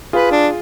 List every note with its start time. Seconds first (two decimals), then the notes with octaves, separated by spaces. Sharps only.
0.13 F4 G#4 B4
0.32 D4